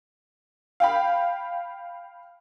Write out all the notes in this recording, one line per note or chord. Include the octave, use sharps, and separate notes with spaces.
F5 G5 B5